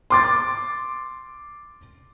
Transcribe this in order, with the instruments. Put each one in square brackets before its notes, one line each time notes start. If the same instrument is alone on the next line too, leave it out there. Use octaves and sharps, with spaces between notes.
[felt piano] C6 D6 A6